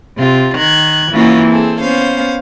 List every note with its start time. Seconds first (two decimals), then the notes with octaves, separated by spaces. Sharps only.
0.18 C3 F4
0.57 D#3 F#6 G#6
1.12 E3 A#3 C#4 F4 F#4
1.47 C4 G#4 A4
1.80 B3 C#4 C5 F5